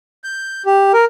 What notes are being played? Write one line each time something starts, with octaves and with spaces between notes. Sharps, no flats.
G6
G4
A#4